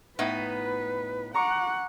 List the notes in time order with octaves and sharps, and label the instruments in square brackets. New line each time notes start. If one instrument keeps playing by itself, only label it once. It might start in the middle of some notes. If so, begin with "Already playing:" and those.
[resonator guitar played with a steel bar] A2 B3 D#4 [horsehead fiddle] B4
[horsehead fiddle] F#5 [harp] A#5 C#6 D6